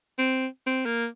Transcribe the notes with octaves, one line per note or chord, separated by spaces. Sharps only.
C4
C4
A#3